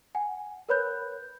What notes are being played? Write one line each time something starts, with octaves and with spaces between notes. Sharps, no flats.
F#5 G#5
A#4 B4 C#5 B5 F#6 G6